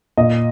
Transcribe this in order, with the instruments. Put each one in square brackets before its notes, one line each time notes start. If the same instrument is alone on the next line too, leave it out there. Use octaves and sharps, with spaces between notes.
[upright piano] A#2 D#5